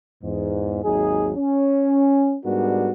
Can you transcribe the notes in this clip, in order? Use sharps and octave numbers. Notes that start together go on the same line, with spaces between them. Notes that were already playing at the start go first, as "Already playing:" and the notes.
E2 G#2
G#1 D#2 F#3 D#4 G#4
C#4
G#2 G3 B3 D4 F#4 A#4